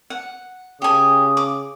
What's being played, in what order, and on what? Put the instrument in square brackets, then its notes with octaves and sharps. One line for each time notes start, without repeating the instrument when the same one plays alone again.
[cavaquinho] F#5
[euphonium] C#3 [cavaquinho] G4 G#5 [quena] D#6
[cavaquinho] D6